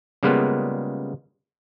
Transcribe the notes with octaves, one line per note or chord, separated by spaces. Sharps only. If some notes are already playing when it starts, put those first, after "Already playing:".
C#3 G3 G#3 A#3 B3 F4